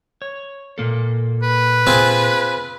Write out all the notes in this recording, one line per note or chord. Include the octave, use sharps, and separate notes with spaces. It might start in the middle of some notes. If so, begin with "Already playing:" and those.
C#5
A#2 A#3 A4
B4
C4 F4 G#4